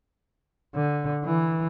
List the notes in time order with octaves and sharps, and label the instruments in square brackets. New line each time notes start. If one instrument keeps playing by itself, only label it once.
[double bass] D3
E3